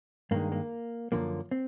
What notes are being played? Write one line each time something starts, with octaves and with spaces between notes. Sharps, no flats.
G2 D#3 G#3 A#3
A#3
F#2 D3 F3 A#3
C4